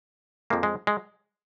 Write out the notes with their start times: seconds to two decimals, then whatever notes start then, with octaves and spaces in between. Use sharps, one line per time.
0.50 F2 F3 G#3 A#3
0.63 G#3
0.87 G#3